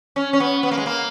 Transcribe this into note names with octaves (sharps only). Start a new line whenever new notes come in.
C#4
C#4
B3
B3
A#3
G#3
A#3